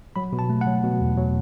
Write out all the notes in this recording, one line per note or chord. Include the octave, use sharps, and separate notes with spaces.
F#3 B5
B2
A5
A3
F#5
F#3
B2
E2
F#3